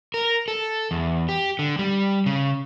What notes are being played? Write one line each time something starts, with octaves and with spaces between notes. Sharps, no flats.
A#4
A4
E2
G4
D3
G3
C#3